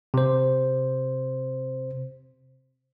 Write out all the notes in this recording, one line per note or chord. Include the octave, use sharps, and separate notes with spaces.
C3 C5